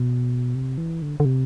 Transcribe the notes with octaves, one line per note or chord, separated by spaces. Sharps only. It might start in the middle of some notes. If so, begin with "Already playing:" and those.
Already playing: B2
C3
E3
D3
D3
C3